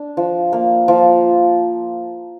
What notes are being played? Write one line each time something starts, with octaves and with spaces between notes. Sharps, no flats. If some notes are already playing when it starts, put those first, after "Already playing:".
Already playing: D4
F3
A#3
F3